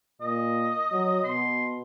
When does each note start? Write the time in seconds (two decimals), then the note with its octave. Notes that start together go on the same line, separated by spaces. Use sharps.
0.21 A#2 D#5
0.92 F#3
1.24 B2 C6